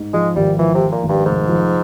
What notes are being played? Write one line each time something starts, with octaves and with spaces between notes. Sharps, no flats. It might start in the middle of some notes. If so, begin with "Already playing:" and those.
Already playing: G#2
F3 G#3
G#1 G3
E3 F3
C3
F3
A#2
G#1
G2
F1 G#2
F3